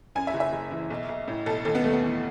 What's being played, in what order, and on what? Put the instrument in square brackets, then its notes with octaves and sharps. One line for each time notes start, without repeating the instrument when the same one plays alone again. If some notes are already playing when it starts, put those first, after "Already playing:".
[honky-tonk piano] F#2 G#5
E5
F#1
E5
F#1
E3
B1
B1
A2
B1 A4
D#2 A4
B3
D#2 A3
B3
E3